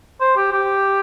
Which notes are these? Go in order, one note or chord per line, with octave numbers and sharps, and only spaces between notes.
C5
G4
G4